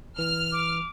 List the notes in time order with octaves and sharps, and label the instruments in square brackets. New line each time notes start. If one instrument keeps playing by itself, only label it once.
[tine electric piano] E3 [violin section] F6
[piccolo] D6